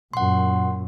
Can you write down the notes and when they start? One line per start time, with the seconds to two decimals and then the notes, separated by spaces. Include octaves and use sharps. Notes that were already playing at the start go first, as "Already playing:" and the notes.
0.13 F#2 A#2 F#5 C6